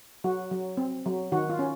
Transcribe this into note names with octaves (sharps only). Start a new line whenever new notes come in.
F#3 F#4
F#3
C4
F#3
D#3 F#4
F4
C#4